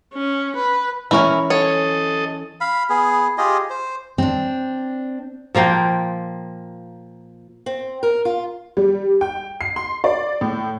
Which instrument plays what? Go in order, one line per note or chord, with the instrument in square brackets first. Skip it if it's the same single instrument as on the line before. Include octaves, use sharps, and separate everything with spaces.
[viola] C#4
B4
[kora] E3 C#4 [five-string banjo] E4 A#4
[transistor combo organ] A4 D#5 [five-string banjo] C#5
[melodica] F5 B5
B3 G#4
F4 G4 G#4 D#5
C5
[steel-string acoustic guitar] C4 D4
[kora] A#2 F3 A#3 G5
[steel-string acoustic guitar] C4
A#4
F4
[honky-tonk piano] G3
G5
C7
C6
D5
A2